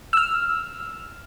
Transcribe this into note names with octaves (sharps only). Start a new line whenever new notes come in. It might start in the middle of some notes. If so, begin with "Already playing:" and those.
E6 F6